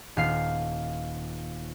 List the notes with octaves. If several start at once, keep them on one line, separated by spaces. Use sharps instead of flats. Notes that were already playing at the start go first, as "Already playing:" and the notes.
D#1 F5 C7